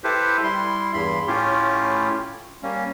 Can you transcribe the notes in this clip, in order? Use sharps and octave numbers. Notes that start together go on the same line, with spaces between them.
E4 G4 A4 B4 C5
G3 E4 C6
E2 G2 B5 C6
A2 A3 C#4 E4 F4 G4
G3 A#3 C#4